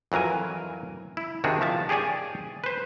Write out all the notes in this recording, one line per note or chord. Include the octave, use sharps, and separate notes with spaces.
F2 E3 F#3 A#4 G#5
E4
C3 D#3 D4 F#4 G#4
F3 E5 A5
G4 G#4 C#5 D5 G#5
B4 C5